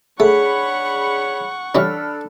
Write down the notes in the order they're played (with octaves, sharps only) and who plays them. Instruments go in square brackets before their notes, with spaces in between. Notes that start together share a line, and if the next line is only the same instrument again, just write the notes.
[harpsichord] A3 [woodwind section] D4 C#5 B5 [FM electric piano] G#4 [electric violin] F#5 C#6
[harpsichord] E3 G3 C#4 [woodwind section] D4 A4 [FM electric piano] B5 F6